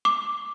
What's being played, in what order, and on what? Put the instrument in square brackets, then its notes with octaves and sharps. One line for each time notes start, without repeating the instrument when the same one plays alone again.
[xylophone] D6